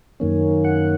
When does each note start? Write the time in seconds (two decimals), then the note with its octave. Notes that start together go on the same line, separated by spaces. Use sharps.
0.20 F#2 D#3 A#3 C#4
0.64 F#5